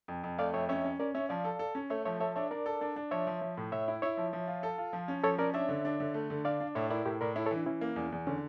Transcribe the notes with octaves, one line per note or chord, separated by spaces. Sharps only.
F2
F2
A3 D5 F5
F2 C#5 E5
C#4 C#5 E5
C#4
C#4 A#4 D5
C#4 C#5 E5
F3 D5 F5
A4
A4
C#4
A3 C#5 E5
F3 C#5 E5
A4 C#5 E5
D4 C#5 E5
D4 A#4 D5
A4
D4
D4
F3 C#5 E5
F3
F3
A2
A2 C#5 E5
E4
E4 C#5 E5
F3
F3
F4
A4
F4
F3
C#4
F3 A4 C#5
C#4 A#4 D5
D4 C#5 E5
D3
D4
D3
A3
D3
D4 D5 F5
D4
A2 C#5 E5
E4 A#4 D5
A2 G4 A#4
A2 A#4 D5
E4 A4 C#5
A4 C#5
E3
D4
E3 C#4 E4
A#3
E2
E2
D3 C#4